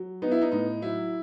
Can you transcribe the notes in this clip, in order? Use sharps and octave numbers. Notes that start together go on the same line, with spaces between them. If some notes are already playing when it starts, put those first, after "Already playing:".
Already playing: F#3
B3 D#4
E4
D#4
A2 D#4
F#3 E4